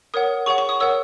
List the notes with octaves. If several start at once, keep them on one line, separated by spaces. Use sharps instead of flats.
A#4 C#5 F#5 D#6
G#4 C#5 F#5 C#6
C#6
D#6
A#4 C#5 F#5 E6